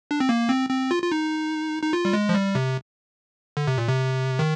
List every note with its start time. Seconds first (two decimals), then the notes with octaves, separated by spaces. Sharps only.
0.11 D4
0.20 C4
0.29 A#3
0.49 C4
0.69 C4
0.91 F4
1.03 F4
1.12 D#4
1.83 D#4
1.93 F4
2.05 G3
2.13 G#3
2.29 F3
2.34 G3
2.55 C3
3.57 D3
3.67 C3
3.78 A#2
3.88 C3
4.39 D#3